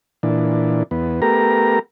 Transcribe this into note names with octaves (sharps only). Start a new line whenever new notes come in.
A#2 E3 D4
E2 B3
A3 B3 G4 A#4 A#5